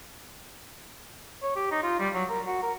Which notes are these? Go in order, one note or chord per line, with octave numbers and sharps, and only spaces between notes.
C#5
G4
D#4
F4
G3
F#3
A#4
F#4
A#4